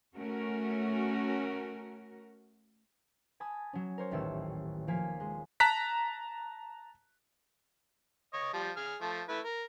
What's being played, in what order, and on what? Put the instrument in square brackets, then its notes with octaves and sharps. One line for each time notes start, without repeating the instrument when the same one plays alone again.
[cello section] A3 C#4 F#4 A#4
[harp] G#5 A5 B5 D#6
F#3 C#4
A#4 C5 C#5
D#1 A1 D#3 A3 G4 E6
F3 A#3 G#5 F6 B6
G#3
[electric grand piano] A5 A#5 F#6 B6
[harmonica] C#5 D#5
F3 G3
G#4 F6
F3 A3
A3 E4 B4
A#4